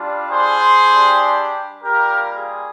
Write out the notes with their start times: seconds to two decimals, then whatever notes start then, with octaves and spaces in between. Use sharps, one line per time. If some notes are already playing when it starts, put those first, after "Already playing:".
Already playing: G3 D4 F4
0.32 G#4 C5
0.83 G3 D4 G4
1.84 G3 A#3 F4 G4 A#4
2.35 G#4